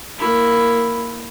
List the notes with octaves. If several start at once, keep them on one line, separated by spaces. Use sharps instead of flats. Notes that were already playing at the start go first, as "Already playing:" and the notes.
A#3 E4